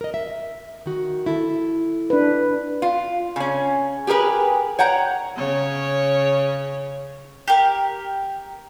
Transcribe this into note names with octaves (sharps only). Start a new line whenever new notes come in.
A#4 D#5
E5
D#3 F#4
E4 A4
D4 B4
F4
C#3 C#4
G4 G#4 A#4 B4
C#5 F#5 G5 A#5
C#3 C#5
G4 A#4